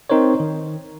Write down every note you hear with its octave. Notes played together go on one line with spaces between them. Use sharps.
C4 D#4 A#4 C5 C#5
D#3